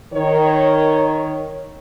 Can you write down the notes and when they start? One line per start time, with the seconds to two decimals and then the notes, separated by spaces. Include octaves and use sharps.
0.13 D#3 C#5